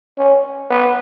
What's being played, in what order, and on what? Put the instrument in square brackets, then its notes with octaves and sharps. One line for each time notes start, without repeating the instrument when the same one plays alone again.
[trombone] C#4
B3